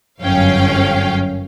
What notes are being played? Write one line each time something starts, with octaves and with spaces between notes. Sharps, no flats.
G1 F#2 C#4 F5 G5